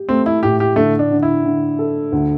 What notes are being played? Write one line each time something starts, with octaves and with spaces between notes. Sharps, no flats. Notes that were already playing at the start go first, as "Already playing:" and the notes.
Already playing: G4
A3 C4
E4
A2 G4
G4
D3 A3
D4
D3
E4
D3
A4
D2